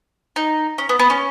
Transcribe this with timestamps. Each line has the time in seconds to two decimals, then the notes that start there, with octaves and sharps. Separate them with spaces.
0.36 D#4
0.78 C#4
0.89 B3
0.99 B3
1.10 C#4